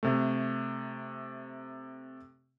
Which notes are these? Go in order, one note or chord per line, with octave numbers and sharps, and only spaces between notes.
C3 A3